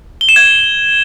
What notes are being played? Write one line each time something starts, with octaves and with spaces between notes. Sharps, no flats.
G7
E7
G#6